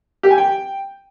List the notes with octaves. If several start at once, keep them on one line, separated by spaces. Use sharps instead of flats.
G4
G#5
G5